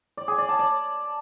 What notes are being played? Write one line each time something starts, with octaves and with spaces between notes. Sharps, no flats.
D5
G#4
D5
A5
D5